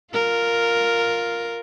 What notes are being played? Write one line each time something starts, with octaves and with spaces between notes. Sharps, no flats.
F4 A#4